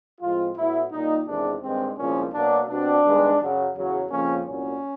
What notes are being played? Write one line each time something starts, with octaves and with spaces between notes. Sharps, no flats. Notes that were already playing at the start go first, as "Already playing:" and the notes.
A2 F3 G#3 C4 F4
A2 F#3 B3 E4
A#2 G3 A#3 D#4
E2 C3 D#3 G#3 D4
G2 D#3 G#3 C4
C2 A#2 F3 G#3 C#4
B2 F#3 A#3 D4
B2 G3 C4 D4
G2 D#3 G#3 B3
F#2 C#3 F#3
E2 C#3 F#3
F2 C#3 F3 A#3 C#4
C2 A#2 F#3 C#4